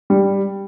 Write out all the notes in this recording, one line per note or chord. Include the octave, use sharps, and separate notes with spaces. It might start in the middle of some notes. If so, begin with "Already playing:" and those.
G3